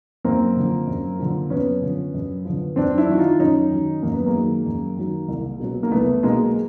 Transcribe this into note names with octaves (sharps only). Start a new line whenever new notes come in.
F#2 A#3 C4
D3 F3
F#2
D3 F3
F#2 B3 C#4
D3 F3
F#2
D3 F3
F#2 C4 D4
D4 E4
D#3 F#3 F#4
D#4 F4
F#2 C#4 D#4
D#3 F#3
F#2 A#3
B3
G#3 A#3
D#3 F#3
F#2
D#3 F#3
C2
B2 F#3
A#3
C2 A3 B3
B2 F#3 G#3 A#3
G#3